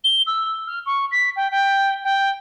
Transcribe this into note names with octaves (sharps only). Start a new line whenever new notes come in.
G7
E6
F6
C#6
B6
G5
G5
G5